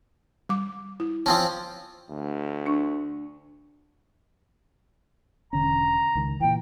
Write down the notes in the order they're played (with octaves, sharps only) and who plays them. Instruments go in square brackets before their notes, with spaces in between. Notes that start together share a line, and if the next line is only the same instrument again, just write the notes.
[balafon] G3 D6
E4
[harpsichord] F3 C4 C#4 [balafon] A5
[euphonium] D2
[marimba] D4 C#6
[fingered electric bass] E1 D3 C#4 [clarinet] A#5
[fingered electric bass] C#2 D#3
[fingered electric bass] A#2 E3 [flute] G5